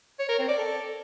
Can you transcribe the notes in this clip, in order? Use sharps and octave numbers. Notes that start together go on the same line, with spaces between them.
C#5
A#4
C4
D5
A4